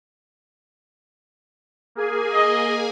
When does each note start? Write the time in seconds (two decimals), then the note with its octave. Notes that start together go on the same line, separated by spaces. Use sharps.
1.95 A#3 G#4 G#5
2.31 D#5